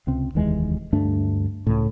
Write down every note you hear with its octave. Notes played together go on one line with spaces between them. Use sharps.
C#2 C3 C4
F1 D#2 E3 G#3
D2 G2 A3 D4
C#2 A2